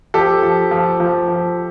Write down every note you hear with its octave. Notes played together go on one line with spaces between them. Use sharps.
F3 G4 A4
F3
F3
F3
F3